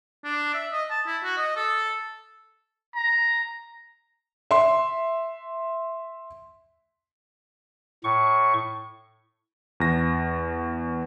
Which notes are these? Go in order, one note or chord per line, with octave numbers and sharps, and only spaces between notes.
D4
E5
D#5
A5
E4
F#4
D#5
A4
A#5
E5 C6
A2 C#6
E2 A#6